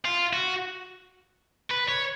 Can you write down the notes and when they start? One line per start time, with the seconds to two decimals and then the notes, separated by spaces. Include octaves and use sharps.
0.05 F4
0.33 F#4
1.71 B4
1.89 C#5